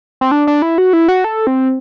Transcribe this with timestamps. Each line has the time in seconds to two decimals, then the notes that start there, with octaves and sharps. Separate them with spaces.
0.21 C4
0.31 D4
0.47 D4
0.62 E4
0.78 F#4
0.93 E4
1.08 F#4
1.24 A4
1.47 C4